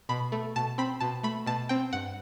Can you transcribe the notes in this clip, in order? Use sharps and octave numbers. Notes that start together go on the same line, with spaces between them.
B2 B5
A3
B2 A5
C4 B5
B2 A5
A3 B5
B2 A5
C4 G5
G2 F#5